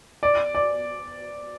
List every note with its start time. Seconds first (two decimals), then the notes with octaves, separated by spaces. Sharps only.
0.23 D5
0.55 D5